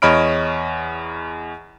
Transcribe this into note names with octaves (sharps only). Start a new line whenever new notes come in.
E2 C#5 D#5 B5 F6 D7